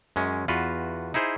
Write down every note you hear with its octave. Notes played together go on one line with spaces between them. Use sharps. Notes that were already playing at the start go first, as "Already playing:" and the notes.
F#2 G#3 C#4
E2 F4 F#4 B4
D#4 E4 G#4 C5